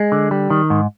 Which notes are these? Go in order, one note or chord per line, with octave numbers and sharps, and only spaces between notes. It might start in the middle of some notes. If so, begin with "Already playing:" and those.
Already playing: G#3
D3
G3
D#3
G#2